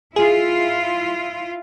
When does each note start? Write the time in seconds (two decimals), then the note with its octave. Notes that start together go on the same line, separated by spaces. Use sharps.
0.16 E4 F4 G#4